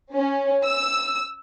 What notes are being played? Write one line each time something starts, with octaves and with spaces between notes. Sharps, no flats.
C#4
E6